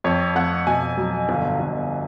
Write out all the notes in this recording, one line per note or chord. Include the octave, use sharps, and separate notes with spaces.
F2 C#5
F2 F#5
B2 G#5
F#3
G1
G1